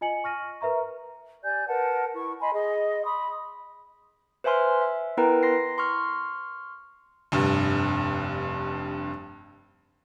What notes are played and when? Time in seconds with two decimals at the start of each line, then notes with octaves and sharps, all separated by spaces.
0.01 F4 D#5 G#5 C#7 F#7
0.24 C#6 F6 A#6 D#7
0.61 A#4 B4 E5 A#5 C#6
1.44 G4 D5 G#5 G6
1.68 A#4 B4 F#5 A5
2.15 E4 C#6
2.40 D#5 G#5 B5 C6
2.54 G#4 D#5
3.04 B5 C6 D#6
4.44 B4 C5 E5 G#5 C6 F6
4.81 E5
5.17 B3 E4 A#4 B4 G5 A#5
5.43 C6 A#6 C7
5.78 C6 C#6 F6
7.32 F1 G2